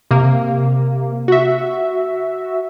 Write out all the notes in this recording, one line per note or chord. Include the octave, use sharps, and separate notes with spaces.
C3 A#3
F#4 E5